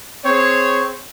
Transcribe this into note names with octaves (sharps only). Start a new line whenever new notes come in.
C4 G#4 C#5